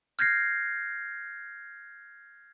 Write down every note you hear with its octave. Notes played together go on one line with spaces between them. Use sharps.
F6 G6 G#6 A#6 C7